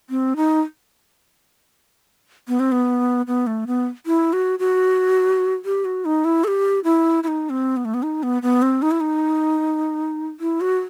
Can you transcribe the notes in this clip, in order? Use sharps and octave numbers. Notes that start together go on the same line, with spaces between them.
C4
D#4
B3
C4
B3
B3
A3
B3
E4
F#4
F#4
G4
F#4
D#4
E4
A4
G4
E4
E4
D#4
C4
B3
A3
B3
D#4
B3
B3
C4
D#4
E4
D#4
E4
F#4